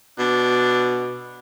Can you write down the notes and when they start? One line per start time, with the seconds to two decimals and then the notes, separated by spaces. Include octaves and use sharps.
0.19 B2 D4